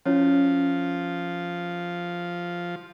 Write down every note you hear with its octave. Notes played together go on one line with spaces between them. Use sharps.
F3 C#4 E4 C#5